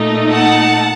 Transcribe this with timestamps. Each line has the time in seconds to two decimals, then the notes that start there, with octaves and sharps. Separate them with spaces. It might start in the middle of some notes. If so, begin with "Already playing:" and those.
Already playing: A#2 A3 D#4
0.32 F#5 A5